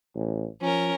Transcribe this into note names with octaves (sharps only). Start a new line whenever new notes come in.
A1
F3 C#4 A#4